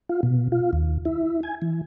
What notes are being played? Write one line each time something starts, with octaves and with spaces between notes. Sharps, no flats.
F4
B2
F4
D#2
E4
G#5
E3